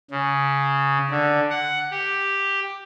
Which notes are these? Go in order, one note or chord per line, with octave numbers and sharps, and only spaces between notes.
C#3
D3
F#5
G4